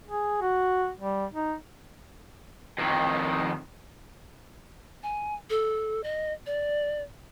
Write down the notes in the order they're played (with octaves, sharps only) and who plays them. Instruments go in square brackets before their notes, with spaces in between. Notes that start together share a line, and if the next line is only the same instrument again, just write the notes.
[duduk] G#4
F#4
G3
D#4
[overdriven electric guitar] F2 D#3
[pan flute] G#5
A4
D#5
D5